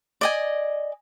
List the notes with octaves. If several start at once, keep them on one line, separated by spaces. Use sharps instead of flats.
D5 D#5 G#5